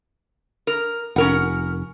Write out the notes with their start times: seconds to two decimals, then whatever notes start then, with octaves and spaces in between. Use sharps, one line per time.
0.67 A#4
1.16 F1 C#4 A#4 F#5